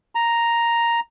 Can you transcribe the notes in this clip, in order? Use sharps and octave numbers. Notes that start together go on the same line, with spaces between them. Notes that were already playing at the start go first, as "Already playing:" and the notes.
A#5